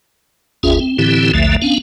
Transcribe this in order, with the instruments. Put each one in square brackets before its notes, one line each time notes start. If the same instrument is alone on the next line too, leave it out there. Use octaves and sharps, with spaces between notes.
[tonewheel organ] G1 D#2 C#4 F4 G#4 E5
C4
A2 D3 E3 C4 E4 G4
A#1 D#2 D3 F3 A3 E5
B3 C#4 D4 F5